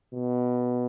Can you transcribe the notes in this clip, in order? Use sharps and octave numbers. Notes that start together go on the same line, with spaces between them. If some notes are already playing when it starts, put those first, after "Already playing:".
B2